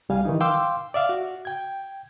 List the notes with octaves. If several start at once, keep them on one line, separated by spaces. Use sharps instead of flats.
C2 G3 F5 G#5
D#3 E3 D#4
F5 G5 C6 D6 E6
D5 E5 F5
F#4
G5 G#6